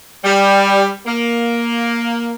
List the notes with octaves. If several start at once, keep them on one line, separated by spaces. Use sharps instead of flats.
G3
A#3